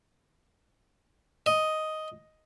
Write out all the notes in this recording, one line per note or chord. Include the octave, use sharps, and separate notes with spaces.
D#5